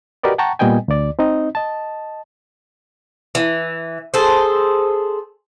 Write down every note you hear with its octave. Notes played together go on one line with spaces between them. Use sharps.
F#4 G4 A#4 B4 D5 D#5
F#5 G5 A5 A#5 C#6
A#2 G3 B3 D#5 G5 G#5
D2 D5
C4 D#4 D#5
D#5 A5
E3
G#4 A4 C5